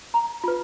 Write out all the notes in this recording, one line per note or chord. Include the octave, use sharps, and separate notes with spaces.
A#5
F4 B4